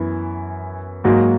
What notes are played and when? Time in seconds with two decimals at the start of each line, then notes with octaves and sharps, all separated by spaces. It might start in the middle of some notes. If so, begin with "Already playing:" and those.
Already playing: F#2 E3 B3 E4
1.04 G#2 F#3 A#3 D#4 F#4